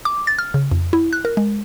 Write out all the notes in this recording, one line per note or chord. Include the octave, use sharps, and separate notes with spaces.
D6
A6
F6
C#3
F2
E4
F#6
A#4
G#3